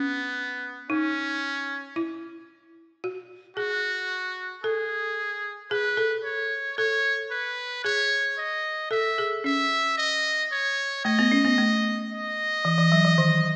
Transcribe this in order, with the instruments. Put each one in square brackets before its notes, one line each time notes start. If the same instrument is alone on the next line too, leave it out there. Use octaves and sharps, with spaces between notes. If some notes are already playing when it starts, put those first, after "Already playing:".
Already playing: [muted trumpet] B3 [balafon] C#4
[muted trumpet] C#4 [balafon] D#4
[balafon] E4
F#4
[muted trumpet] F#4 [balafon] G#4
[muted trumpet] G#4 [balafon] A4
[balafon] G#4 [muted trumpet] B4
[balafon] A4
[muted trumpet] C#5
[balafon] A4 [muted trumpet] C#5
[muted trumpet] B4
[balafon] G#4 [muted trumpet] C#5
[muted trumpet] D#5
[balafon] A4 [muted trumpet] E5
[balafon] G#4
[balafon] C#4 [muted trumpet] E5
[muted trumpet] D#5
C#5
[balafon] A3 [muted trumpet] D#5
[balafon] B3
C#4
B3
A3
[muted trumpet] D#5
[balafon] E3
E3
F#3
E3
D#3